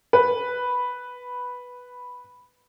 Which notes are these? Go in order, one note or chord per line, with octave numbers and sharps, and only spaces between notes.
B4